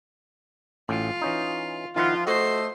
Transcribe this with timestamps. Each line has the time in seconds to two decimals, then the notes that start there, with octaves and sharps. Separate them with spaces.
0.89 A1 A2 F4
1.22 E3 C#4 D#4
1.96 D#3 F3 E4 F4 F#5
2.27 A3 F#4 A4 C5 D#5